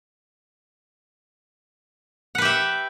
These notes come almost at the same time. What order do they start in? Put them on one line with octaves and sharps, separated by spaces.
F#5 B4 G4 E5